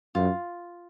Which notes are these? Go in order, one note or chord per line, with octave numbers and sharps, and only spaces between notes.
F#2 F4